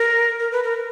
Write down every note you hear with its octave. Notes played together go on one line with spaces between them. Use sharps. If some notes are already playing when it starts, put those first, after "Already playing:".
Already playing: A#4
A#4
B4
A#4